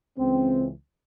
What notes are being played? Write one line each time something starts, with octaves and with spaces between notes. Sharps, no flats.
C#2 C#3 E3 C4